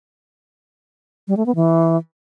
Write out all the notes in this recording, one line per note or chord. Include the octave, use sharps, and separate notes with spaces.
G3
A3
B3
E3